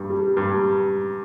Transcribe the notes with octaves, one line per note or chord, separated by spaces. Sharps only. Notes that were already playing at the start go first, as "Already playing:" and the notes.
Already playing: G2
G3
G2